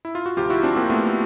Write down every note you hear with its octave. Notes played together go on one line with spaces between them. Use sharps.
E4
F4
F#4
D2 C3 F3 F4 G4
E4 F#4
C4 D4
A#3 C4
A3 B3